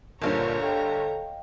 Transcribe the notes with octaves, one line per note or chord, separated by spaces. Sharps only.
G1 G2 A#2 D3 A#4 C5 C#5 A#5
A4 D#5 F5 G5